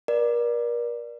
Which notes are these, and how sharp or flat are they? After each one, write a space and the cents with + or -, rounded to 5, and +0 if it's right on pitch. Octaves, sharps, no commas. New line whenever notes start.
A#4 +35 D5 +10